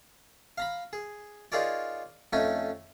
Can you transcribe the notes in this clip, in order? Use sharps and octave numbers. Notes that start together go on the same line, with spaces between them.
F5 A#5 B5
G#4
D#4 F4 G#4 A#4 C#5 D5
F2 A3 C#4 D#4 G#5